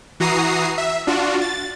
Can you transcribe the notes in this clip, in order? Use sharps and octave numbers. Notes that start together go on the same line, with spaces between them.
E3 F#4 A#5 D#6 C7
E5
D4 F4 F#4
A6